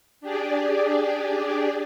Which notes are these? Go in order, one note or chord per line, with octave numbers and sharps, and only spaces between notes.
D4 G4 G#4 D5